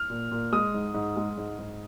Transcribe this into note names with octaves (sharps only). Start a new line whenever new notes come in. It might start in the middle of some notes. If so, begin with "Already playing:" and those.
Already playing: F6
A#2
A#2
G#3 D#6
G#2
G#2
G#3
G#2
G#2